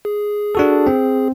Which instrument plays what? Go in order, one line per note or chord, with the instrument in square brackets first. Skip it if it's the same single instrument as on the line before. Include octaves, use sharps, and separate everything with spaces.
[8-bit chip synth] G#4
[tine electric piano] D4 F#4 A4
C4